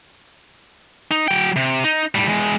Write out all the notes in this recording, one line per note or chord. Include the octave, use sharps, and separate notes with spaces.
D#4
F#3 G5
C3
D#4
A2 G3
E2 G#3